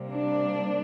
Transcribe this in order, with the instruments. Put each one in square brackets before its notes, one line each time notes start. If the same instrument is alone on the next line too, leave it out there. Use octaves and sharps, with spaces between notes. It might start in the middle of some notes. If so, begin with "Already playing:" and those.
Already playing: [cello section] C3 G3 A#3
D4